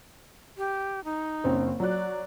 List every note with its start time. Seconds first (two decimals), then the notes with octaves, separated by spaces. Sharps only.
0.57 G4
1.04 D#4
1.44 F#1 C4 C#4
1.80 F#3 D5 F#6